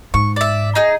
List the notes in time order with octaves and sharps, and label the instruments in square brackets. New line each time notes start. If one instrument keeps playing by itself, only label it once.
[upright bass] G#2 [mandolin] C#6
[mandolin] D5 E5
D#4 G#4